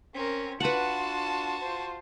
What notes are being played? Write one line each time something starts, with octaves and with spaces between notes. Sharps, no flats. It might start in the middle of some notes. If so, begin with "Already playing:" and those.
C4 C#4 A#4
D4 F4 F#4 B4 F#5 A5
F4 C5